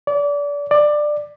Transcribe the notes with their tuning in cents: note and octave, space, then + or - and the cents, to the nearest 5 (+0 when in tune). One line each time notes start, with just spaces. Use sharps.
D5 -30
D5 +15